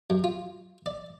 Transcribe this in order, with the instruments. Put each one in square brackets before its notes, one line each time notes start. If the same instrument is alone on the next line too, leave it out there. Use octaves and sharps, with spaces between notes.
[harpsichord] F#2
F4
D5